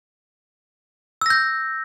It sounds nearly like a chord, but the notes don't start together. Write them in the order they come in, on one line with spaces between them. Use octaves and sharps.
E6 A#6 G6